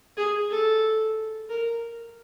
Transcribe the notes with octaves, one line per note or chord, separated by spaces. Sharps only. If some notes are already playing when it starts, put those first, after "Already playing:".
G#4
A4
A#4